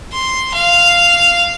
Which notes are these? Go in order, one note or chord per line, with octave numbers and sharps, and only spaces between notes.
C6
F5